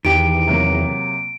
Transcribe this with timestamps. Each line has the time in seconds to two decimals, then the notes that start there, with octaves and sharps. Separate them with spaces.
0.05 E2 D#3 G4 D7
0.47 C3 F#3 A#3